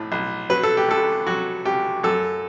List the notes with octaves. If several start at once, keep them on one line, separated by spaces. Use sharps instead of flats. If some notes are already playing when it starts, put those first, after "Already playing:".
Already playing: B1 A2
B1
F#3 B4
A4
G4
C#2 A4
F#3 F#4
C#2 G4
F#2 A4